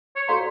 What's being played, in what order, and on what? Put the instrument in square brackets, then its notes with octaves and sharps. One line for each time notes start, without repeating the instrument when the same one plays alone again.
[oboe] C#5
[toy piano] F#4 A4 D5 F5 A#5 [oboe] C5